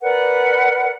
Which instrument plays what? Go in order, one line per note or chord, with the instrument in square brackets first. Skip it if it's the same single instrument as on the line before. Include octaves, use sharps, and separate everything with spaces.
[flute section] A#4 B4 D5 F#5